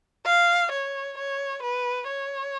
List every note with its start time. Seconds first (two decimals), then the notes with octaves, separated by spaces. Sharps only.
0.26 F5
0.72 C#5
1.18 C#5
1.63 B4
2.08 C#5